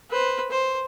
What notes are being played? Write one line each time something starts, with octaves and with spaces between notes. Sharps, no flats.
B4 C5
C5